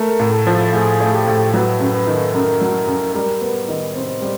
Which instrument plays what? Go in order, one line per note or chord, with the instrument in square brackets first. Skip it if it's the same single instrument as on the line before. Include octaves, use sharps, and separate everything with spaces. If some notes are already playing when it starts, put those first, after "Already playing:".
Already playing: [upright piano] A3 [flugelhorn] A#4
[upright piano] A2
[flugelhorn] A4
[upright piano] F3
[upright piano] A2 [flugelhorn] G#4
[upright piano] A3
[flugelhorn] G4
[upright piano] A2
[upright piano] F#3 [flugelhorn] B4
[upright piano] F#2
[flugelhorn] B4
[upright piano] D#3
[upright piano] F#2 [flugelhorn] A#4
[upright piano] F#3
F#2
[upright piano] G3 [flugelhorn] A#4
[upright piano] B3
D#3
[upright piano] C3 [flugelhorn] C5
[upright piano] G3